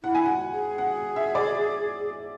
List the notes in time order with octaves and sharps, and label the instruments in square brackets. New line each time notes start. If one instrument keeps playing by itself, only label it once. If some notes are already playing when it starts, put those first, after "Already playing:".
[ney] E4 [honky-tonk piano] F#5
[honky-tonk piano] G#5
F#5
[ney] G#4
[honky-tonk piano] F#5
E5
D5